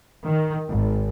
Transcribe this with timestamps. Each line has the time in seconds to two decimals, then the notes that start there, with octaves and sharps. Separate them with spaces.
0.24 D#3
0.69 G#1